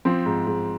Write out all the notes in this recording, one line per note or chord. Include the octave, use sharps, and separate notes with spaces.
F3 C4
G#2
G#2